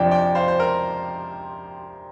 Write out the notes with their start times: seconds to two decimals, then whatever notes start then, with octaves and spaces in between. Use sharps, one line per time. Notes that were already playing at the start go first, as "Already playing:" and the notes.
Already playing: F2 C3 F3 D4 D5 G5
0.11 D5 G5
0.35 C5 F5
0.48 C5
0.60 A#4